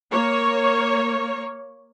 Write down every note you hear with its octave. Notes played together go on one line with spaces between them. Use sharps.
A#3 C#5